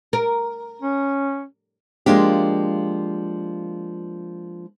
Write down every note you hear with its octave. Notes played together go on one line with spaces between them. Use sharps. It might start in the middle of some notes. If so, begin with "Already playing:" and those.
A#4
C#4
F3 G#3 A#3 D4 G4